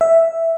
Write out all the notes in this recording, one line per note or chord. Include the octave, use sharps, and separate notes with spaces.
E5